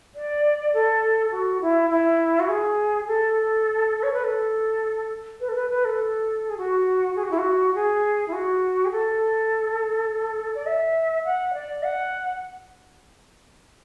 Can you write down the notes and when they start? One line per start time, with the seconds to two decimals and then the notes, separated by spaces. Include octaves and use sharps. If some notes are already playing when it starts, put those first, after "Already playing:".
0.15 D5
0.74 A4
1.32 F#4
1.61 E4
1.90 E4
2.40 F#4
2.48 G#4
3.07 A4
4.03 C#5
4.13 B4
4.24 A4
5.41 B4
5.49 A4
5.55 B4
5.70 B4
5.85 A4
6.49 G#4
6.58 F#4
7.16 G#4
7.24 F#4
7.31 E4
7.38 F#4
7.75 G#4
8.28 E4
8.33 F#4
8.85 G#4
8.91 A4
10.55 D5
10.66 E5
11.25 F#5
11.54 D5
11.83 F#5